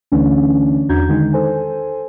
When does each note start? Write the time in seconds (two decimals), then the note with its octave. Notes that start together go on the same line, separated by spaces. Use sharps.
0.12 D2 D3 E3 A3 C#4 D4
0.89 E2 D4 F#4 A#5 G6 G#6
1.08 D3 D#3 G#3 D#4
1.33 A4 C5 G#5